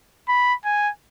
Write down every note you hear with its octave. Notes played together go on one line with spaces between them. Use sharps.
B5
G#5